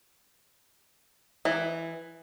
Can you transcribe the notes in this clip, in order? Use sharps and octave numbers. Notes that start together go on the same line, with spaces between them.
E3